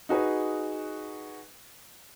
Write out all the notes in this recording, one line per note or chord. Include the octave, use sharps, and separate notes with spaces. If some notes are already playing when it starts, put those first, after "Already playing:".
D#4 F#4 G#4 B4